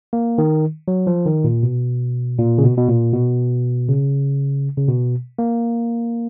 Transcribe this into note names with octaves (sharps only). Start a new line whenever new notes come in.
A#3
D#3
F#3
F3
D#3
A#2
B2
A#2
C#3
B2
B2
A#2
B2
C#3
C#3
B2
A#3